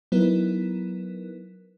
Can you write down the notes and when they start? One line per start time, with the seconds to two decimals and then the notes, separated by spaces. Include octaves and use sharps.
0.12 F#3 B3 D#4 E4 A#4 B4